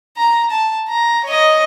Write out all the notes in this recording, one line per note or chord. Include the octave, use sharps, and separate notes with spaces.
A#5
A5
A#5
C#5 D#5